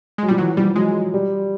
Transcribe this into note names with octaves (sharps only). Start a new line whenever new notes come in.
F#3 G#3
F3 G3
E3 F#3
F3 G3
F#3 G#3
G3